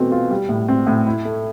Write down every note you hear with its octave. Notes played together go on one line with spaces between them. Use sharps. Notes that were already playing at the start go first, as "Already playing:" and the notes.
Already playing: B2 E3 A3 C4
F4
G3
A2
C4
A2
E4
A3